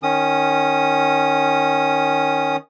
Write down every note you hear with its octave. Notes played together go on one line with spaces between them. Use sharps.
D#3 C#4 D#6